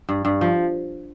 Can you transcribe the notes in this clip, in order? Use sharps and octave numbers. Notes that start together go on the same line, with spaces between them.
G2
G2
F3